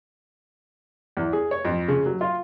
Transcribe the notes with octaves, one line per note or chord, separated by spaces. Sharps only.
E2
G#4
C#5
F2
C#3
F#3
F4